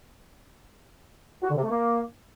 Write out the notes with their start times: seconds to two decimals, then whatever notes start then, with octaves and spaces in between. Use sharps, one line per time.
1.43 F#4
1.50 D3
1.56 C3
1.63 A3
1.69 A#3